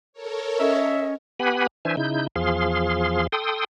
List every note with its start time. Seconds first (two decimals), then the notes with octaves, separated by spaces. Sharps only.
0.13 A4 A#4 C#5
0.60 C#4 D#5 E5
1.40 B3 G4 B4 F#5 G#5 B5
1.85 E3 D4 C5 E5 G#5
1.97 C#3 D#4 E4 G6
2.36 E2 F3 G#4 F5 C6
3.32 A4 G5 C6 D#6